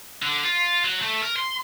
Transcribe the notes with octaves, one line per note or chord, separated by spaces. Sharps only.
D3
F4
F#3
A3
A#4
C6